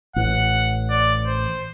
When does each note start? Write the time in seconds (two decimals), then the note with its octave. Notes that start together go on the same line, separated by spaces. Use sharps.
0.16 A1 F#5
0.90 D5
1.27 C5